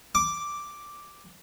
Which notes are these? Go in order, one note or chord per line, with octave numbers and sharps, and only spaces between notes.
D6